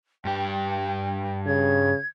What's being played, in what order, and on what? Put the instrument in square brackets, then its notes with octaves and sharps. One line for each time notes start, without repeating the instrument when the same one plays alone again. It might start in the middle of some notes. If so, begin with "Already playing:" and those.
[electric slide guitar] G2 G4 [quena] G5
[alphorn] C#3 [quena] G#6